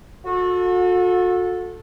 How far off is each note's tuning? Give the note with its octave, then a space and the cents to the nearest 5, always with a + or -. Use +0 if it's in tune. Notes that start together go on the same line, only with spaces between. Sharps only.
F#4 -40 A4 +0